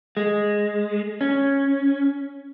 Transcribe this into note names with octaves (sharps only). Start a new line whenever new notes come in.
G#3
C#4